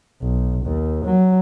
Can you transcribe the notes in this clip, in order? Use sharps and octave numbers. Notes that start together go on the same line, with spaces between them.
B1
D#2
F#3